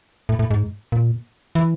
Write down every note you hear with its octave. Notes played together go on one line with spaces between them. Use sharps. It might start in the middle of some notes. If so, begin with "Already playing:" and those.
A2
A2
G#2
A#2
E3